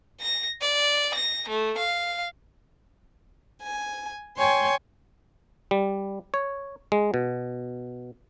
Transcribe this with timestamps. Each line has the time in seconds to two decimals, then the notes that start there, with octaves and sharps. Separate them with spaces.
0.21 A#6
0.61 D5
1.15 A#6
1.48 A3
1.78 F5
3.63 G#5
4.39 C#5 G5 G#5 C6
5.71 G3
6.34 C#5
6.92 G#3
7.14 B2